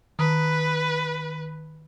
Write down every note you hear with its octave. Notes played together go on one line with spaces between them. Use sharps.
D#3 B4